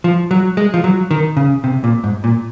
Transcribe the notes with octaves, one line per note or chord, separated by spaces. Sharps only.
F3
F#3
G#3
F3
F#3
D#3
C#3
C3
A#2
G#2
A#2